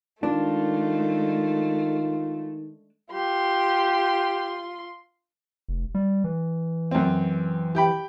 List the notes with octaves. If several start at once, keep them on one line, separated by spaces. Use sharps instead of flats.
D#3 G#3 A3 D4 F4
F4 G4 C6
F1
G3
E3
F#2 C4
G4 G5 B5